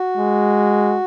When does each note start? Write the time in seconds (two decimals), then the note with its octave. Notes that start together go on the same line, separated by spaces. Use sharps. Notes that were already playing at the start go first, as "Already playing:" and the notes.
Already playing: F#4
0.17 G#3